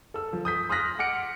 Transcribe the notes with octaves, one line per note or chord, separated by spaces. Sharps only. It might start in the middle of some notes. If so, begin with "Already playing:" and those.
A4 E6
F3
D#6 G6 B6
C6 D#6 F6 F#6 A#6 B6
F#5 D6 F6 C#7 D7